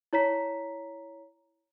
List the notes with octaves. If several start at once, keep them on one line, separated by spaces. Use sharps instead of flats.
E4 C#5 A#5 B6